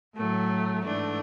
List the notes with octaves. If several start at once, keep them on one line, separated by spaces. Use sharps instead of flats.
A2 F#3 A3
G#2 E3 A3 D4